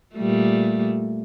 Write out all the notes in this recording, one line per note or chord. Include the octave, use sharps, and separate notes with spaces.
A#2 G3 A3